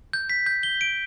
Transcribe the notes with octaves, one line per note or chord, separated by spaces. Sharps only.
G6
B6
G6
G7
D7